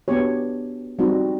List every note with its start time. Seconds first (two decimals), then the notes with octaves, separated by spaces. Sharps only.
0.08 B3 D4 G4 C#5
0.99 G3 C4 D#4 F#4